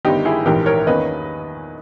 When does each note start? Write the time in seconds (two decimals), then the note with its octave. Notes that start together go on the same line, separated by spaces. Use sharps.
0.05 G1 G2 D#3 D#4 G4
0.25 E4 G#4
0.46 A#1 G#2 E3 G4 A#4
0.66 A#4 C#5
0.87 E2 D#3 A#3 C#4 B4 D#5